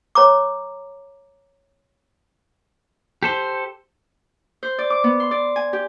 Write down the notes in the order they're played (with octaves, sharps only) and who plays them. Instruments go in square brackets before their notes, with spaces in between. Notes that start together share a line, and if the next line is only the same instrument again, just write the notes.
[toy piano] C#5 A#5 D6
[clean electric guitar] G4 A4 C5
[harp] C5
D5
D6
B3
C6
D5
G#5
G4